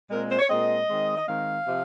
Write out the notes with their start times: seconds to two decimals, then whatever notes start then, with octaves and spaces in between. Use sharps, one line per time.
0.10 A#2 G#3 C4 A#4
0.30 C5
0.39 C#5
0.49 A#2 G#3 C4 D#5
0.88 D#3 G#3 C4
1.17 D#5
1.27 D#3 G#3 C4 F5
1.66 C3 F3 C4